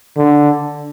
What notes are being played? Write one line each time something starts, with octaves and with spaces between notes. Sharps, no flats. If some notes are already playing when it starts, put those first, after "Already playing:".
D3